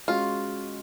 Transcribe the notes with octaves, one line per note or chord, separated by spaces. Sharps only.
G#3 C#4 F4 F#4